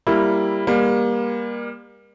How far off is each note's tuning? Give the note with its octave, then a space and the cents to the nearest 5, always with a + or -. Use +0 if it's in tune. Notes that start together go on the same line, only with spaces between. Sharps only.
G3 +0 A#3 +0 E4 +0
G3 +35 A#3 +30